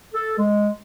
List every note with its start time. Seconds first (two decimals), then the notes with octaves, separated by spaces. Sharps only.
0.13 A4
0.38 G#3